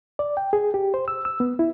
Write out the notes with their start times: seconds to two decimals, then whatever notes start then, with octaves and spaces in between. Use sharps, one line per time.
0.19 D5
0.37 G5
0.53 G#4
0.74 G4
0.94 C5
1.08 E6
1.25 E6
1.40 B3
1.59 E4